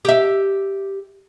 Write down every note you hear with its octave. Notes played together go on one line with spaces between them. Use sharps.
G4 E5